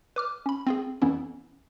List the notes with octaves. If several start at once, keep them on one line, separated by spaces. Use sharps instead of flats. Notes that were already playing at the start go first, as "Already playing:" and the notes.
B4 D6 F6
C#4 B5
C4 F4 G#4
F2 E3 B3 C#4 E4